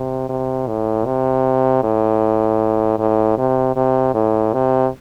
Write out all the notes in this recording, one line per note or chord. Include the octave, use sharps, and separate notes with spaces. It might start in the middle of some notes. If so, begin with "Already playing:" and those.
Already playing: C3
C3
A2
C3
A2
A2
C3
C3
A2
C3